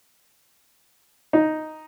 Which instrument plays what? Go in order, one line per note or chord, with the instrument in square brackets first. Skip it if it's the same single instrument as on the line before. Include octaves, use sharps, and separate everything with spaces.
[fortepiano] D#4